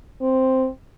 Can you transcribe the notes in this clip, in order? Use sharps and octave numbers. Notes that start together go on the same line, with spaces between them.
C4